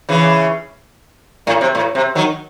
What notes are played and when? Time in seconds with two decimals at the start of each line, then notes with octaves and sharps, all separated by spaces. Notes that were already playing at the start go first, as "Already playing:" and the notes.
0.09 C#3 E3
1.47 A2
1.61 C3
1.75 A2
1.95 C3
2.15 D#3 F#3